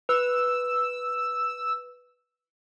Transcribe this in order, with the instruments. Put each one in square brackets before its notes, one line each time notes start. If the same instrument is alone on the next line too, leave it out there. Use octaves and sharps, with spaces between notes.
[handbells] B4 [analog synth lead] E6